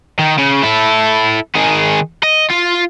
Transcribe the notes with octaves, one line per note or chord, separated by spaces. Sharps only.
D#3
C#3
E4 A4
D#3 G#4
D#5
F4